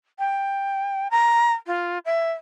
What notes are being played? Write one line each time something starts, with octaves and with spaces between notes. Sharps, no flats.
G5
A#5
F4
E5